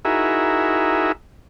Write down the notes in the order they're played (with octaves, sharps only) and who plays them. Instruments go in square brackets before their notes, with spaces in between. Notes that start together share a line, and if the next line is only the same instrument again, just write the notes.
[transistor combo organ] D#4 E4 F#4 G#4 A#4 E5